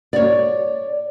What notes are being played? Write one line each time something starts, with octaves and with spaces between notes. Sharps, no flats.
C#5 D5